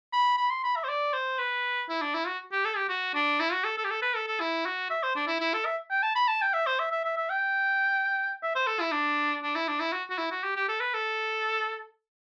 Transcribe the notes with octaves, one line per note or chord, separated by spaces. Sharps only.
B5
B5
C6
B5
E5
C5
D5
C5
B4
E4
D4
E4
F#4
G4
A4
G4
F#4
D4
E4
F#4
A4
A4
G4
A4
B4
A4
A4
E4
F#4
E5
C5
D4
E4
E4
A4
E5
G5
A5
B5
A5
G5
E5
C5
E5
E5
E5
E5
G5
E5
C5
A4
E4
D4
D4
E4
D4
E4
F#4
F#4
E4
F#4
G4
G4
A4
B4
A4